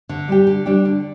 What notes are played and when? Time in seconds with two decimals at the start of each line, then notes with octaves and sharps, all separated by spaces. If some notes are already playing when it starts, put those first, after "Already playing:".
0.09 D3
0.28 G3 D4 G4
0.47 D3
0.66 G3 D4 G4
0.85 D3